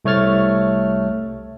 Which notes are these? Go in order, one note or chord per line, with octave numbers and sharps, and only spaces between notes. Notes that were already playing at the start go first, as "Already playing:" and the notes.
C2 A3 C#5 F6 A6